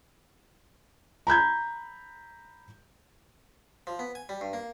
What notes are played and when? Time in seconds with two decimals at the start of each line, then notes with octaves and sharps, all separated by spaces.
1.27 A#5 B5 G6 G#6
3.87 F3
3.99 B3
4.15 G#5
4.29 G3
4.41 G2
4.53 A#3